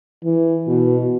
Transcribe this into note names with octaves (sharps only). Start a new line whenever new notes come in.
E3
B2